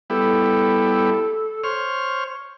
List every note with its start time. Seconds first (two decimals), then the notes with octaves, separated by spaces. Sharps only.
0.10 G3 B3 E4 A4
1.64 C5 C#5 F6